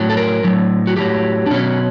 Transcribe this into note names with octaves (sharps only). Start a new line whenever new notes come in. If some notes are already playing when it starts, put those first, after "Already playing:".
Already playing: A2 F#3
A4
A#4
A2 F#3
F#4
A2 F#3 G4
D4
B2 F#3 C#4